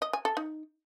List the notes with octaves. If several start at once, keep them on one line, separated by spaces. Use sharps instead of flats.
D#5
G#5
A4
D#4